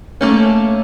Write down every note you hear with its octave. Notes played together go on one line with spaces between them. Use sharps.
A3 A#3 C#4